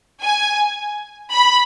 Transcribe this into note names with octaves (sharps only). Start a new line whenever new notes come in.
G#5
B5